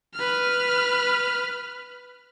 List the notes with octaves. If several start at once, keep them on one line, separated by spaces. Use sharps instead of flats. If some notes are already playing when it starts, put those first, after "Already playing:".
B4 F6